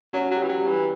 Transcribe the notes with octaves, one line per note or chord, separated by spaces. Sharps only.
F#3 C#4
F#3
G4
E3
F#3
G3
E3